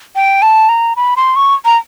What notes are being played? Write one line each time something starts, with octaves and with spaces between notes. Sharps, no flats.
G5
A5
A#5
B5
C6
C#6
A#5